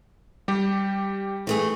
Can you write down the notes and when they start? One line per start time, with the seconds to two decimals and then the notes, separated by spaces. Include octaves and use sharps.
0.48 G3 G4
1.47 E3 A3 G#4